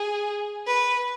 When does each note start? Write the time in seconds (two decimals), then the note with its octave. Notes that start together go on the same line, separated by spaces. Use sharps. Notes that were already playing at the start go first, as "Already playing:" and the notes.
Already playing: G#4
0.66 B4